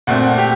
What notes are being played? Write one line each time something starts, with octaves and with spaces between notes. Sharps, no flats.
A#2 A3 C4 F#5
G4